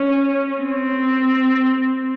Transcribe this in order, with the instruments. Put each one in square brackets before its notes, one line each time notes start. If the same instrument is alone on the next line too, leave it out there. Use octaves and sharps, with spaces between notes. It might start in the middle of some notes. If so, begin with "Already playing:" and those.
Already playing: [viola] C#4
C4